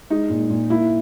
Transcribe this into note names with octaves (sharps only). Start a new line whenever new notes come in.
G#3 D#4
A#2
A#2
A#3 E4